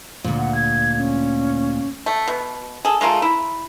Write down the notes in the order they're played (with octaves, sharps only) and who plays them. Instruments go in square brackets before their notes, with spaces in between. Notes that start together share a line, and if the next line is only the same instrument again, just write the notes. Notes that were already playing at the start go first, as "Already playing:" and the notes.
[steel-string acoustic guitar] D2 A#2
[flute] F#5
G#6
C#4
[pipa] A3
B2
G#4 A4
G#3 A3 F4 A#4
E4